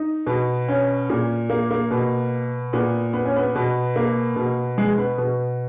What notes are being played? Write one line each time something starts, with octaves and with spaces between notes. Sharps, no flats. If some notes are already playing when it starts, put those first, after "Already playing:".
Already playing: D#4
B2
C#4
A#2
A#3
A#3
B2
A#2 B3
B3
C#4
B3
B2
A#3
B2
G#3
B3
B2